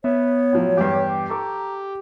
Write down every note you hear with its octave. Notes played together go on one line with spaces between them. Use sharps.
B3 C#5 E5
A2 F3 F#3
E2 G2 G4
A4 A#5 C#6 D6